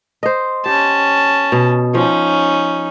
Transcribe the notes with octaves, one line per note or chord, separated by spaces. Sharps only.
C5 D#5
C#4 G4 A5
B2
F3 C#4 D#4